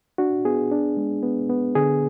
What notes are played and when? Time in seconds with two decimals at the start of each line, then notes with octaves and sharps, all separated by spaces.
0.18 D4 F#4
0.45 B3 G#4
0.71 D4
0.97 G#3
1.23 B3
1.49 B3
1.75 D3 G#4